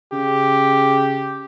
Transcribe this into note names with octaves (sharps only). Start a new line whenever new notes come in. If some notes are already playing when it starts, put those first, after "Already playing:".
C#3 G4